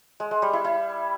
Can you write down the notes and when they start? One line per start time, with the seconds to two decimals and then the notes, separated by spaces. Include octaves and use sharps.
0.20 G#3
0.31 G#3
0.42 G3
0.53 E4
0.65 E4